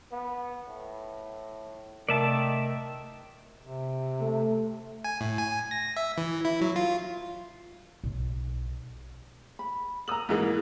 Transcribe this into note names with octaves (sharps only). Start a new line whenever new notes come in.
B3
A2
C3 D#3 A3 A#4 D5 E5 A5
C3
A3
G#5
A2
G#5
A#6
E5
E3
E4
F#3
F4
B1
B5
A#4 A#5 D#6 E6 F#7
G#2 E3 A#3 D#4 G#4 D#5